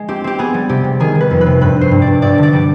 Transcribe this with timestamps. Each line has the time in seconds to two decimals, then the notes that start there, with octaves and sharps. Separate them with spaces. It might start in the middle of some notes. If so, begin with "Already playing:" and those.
Already playing: G#3
0.08 C4 G4
0.24 C4 G4
0.38 B3 G#4
0.54 G3
0.69 C3 G4
0.84 C3
1.00 D#3 G#4
1.15 D#3
1.21 B4
1.30 F2
1.41 B4
1.46 C3
1.61 G2 B4
1.76 G2
1.81 C5
1.91 G2
2.02 D5
2.07 G2
2.22 G2 D5
2.38 D3 D5
2.53 G3